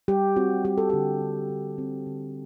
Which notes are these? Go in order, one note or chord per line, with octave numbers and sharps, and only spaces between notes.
G3 G4
C4 F#4
G3 G4
A4
D3 G4
D3
D3
C4
D3